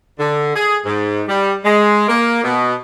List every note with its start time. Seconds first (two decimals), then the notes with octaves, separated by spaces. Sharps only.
0.19 D3
0.56 G#4
0.86 G#2
1.28 G3
1.65 G#3
2.09 A#3
2.44 B2